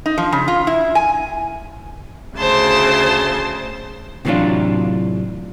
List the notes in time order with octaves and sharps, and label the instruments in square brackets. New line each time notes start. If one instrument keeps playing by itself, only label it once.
[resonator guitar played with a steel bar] D#4
F3
C#3
F4
E4
G#5
[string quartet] D2 C#3 C5 A5
[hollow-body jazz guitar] A2 C3 E3 F#3 D4 F4